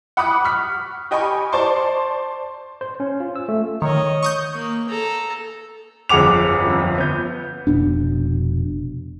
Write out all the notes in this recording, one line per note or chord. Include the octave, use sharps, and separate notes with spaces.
F#5 B5 D6 D#6 F#6
C#6 F6 B6
G4 D#5 G#5 B5 C#6
C5 D5 A5 C6 C#6
C5
C#4
F4
E6
A3
D#3 C#5 D#5
C#6 D#6 G6
A#3
A4 A#5
G1 F2 G#4 F#5 D6 F7
G1 F2
B3 G6
F1 B2 D4